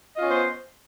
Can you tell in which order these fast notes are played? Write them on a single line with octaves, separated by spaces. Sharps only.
D#5 F4 C#4 B3 C5